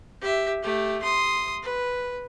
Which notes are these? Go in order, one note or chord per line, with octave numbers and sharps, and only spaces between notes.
G4 E5
A3 G4
C6 D#6
B4